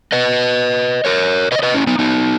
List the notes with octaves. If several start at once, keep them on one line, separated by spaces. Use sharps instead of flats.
B4 D#5
A#4 C#5
B4 D#5
C#5
B4 D#5
C#4 E4
B3 D#4
B3 D#4